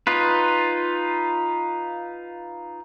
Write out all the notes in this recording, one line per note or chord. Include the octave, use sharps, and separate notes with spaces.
D#4 F4 B4